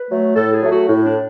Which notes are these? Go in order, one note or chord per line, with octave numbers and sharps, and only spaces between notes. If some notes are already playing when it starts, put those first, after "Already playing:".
Already playing: B4
F#3 A3
A2 A4
G#4
F#3 A3
F#4
A2
D4